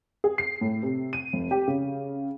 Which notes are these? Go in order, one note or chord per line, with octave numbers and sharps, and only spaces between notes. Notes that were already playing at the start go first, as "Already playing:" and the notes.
G#4
C7
A2
C3
D#7
F1
G4
C#3